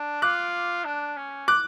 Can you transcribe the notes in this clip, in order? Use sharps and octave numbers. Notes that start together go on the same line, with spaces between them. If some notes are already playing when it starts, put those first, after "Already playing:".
Already playing: D4
F4 D6 F#6
D4
C#4
D6 F#6